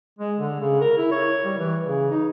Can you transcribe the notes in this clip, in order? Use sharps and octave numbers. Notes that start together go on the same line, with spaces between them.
G#3
D3
C#3
A#4
E4
C#5
G3
E3
C#3
D#4